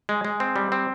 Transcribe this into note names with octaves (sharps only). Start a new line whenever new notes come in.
G#3
G#3
C4
G3
C4